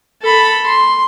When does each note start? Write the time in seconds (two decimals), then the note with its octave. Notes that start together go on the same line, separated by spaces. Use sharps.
0.22 A4 B5
0.66 C6